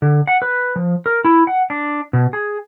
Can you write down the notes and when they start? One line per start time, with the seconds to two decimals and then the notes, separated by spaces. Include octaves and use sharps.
0.02 D3
0.27 F#5
0.42 B4
0.76 F3
1.06 A#4
1.25 E4
1.47 F#5
1.70 D4
2.13 B2
2.33 G#4